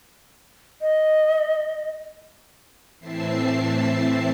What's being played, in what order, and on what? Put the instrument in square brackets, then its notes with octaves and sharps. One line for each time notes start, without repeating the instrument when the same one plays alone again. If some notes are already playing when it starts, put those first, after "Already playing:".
[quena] D#5
[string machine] A2 E3 C4 E5 A5 C7